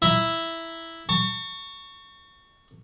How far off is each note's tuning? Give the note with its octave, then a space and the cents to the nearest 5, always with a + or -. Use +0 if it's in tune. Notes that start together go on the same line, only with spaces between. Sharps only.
E4 +0 E5 +0 A#5 +0
A5 +45 C#6 +5